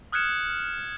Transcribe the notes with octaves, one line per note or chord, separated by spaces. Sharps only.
D#6 F6 F#6 G#6 C#7 E7